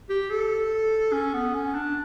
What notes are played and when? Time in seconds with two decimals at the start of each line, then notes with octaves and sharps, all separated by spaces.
0.09 G4
0.30 A4
1.12 C#4
1.34 B3
1.54 C#4
1.74 D4